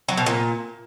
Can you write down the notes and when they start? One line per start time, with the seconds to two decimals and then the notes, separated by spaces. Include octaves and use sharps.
0.08 F#3
0.17 B2
0.26 A#2